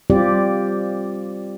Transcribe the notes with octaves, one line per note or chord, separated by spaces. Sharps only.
G3 C4 F4 G4 D5